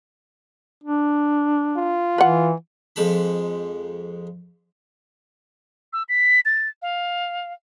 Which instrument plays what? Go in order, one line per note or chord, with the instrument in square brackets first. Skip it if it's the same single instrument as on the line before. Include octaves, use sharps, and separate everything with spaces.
[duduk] D4
[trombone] F4
[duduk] E3 [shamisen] B4 F#5
[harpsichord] F2 G#3 A5 B5
[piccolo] E6
B6
A6
F5